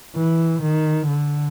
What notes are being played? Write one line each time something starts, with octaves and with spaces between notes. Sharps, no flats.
E3
D#3
D3